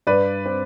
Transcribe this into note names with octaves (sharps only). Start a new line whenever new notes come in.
G2 B4 D5
C4